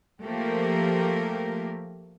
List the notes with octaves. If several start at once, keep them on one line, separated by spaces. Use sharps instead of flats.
F3 A3 A#3 G4 A#4